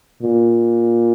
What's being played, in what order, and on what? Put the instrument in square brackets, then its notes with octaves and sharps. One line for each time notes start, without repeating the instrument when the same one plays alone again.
[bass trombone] A#2